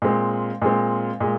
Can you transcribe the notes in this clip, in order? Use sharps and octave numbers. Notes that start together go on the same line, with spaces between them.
A#2 G#3 C4
A#2 G#3 C4
A#2 G#3